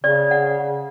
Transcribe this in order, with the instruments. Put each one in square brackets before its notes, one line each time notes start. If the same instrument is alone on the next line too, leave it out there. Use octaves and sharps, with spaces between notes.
[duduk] C#3 [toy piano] D5
[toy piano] F#5